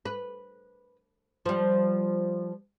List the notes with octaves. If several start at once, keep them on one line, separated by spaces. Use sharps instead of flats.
B4
F3 G3